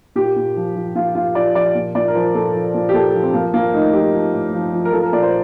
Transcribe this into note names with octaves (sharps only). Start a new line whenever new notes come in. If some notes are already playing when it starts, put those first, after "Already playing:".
A#2 G4
A#2
F3
F3
A#2 F4
A#2 F4
F3 D5
F3 D5
A#2
A#2 D5
A#4
F3 C5
A#2 A4
F3
A#2
G4
A#2 A4
F3
C4
F3 A#3
F3 A#3
A2 D#4
F3 G4
F3
A2
F3
F3
A#4
F3 A4
A#4
A#2 D5
C5